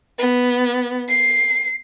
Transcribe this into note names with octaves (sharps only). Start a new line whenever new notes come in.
B3
C7